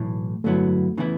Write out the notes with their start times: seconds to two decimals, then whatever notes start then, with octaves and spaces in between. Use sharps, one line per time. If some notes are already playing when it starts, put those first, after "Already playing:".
Already playing: B1 A2 E3 A3
0.44 G2 D3 F#3 A3 B3 E4
0.97 C#3 E3 B3 E4